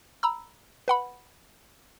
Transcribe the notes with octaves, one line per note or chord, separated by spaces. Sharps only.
A#5 B5 E6
B4 F#5 B5